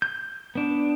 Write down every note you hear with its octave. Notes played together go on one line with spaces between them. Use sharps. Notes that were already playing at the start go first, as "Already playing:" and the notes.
G6
B3 D4